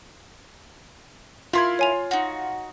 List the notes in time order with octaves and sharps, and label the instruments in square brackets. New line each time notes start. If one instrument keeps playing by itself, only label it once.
[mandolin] E4 A#4 [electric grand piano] F4 C6 G#6
[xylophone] C#5 G#5 F7
[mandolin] D#4 F#4